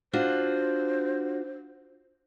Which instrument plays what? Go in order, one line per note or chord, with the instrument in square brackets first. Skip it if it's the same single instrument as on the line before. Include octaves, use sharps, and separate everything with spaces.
[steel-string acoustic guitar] D4 F4 F#4 [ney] C5